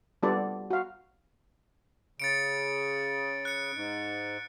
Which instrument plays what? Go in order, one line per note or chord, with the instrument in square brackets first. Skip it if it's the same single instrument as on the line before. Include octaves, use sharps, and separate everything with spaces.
[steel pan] G3 B3 D4 F4 A4 D5
F#4 F5
[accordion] C#3 [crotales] A6 C#7 D7
[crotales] F#6 C#7
[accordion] G#2